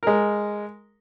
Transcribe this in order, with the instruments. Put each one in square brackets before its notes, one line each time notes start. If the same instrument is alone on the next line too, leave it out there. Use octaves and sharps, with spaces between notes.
[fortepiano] G#3 A#4